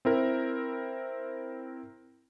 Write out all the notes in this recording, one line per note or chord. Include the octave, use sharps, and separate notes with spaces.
C4 E4 A#4